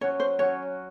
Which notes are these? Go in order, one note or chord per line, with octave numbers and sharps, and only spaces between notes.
F#3 C#4 F#4 C#5
C5
F#3 C#4 F#4 C#5